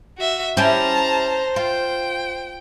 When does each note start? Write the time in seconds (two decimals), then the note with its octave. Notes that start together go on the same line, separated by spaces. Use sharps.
0.18 F#4 E5
0.57 C#4 E4 G4 C5 A5 A#5
1.56 F4 G5